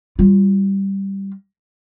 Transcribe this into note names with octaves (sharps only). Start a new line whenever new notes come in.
G3 F4